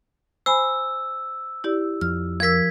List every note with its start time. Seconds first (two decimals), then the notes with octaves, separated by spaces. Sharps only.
0.46 C5 G#5 B5 E6
1.64 E4 G4 D5
2.01 F2 F6
2.40 F3 A#4 E6 G#6 B6